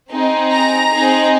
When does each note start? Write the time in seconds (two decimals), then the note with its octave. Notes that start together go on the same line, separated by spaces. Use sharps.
0.11 C4 D#4 G#4
0.51 A#5
0.92 C4 D#4 G#4